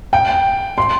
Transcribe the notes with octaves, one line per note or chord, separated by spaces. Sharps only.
G5
C6